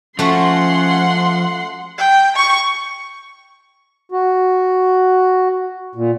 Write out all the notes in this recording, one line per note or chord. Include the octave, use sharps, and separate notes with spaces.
F3 A3 C#4 F#4 F#5 C6
G5
C#6
F#4
A#2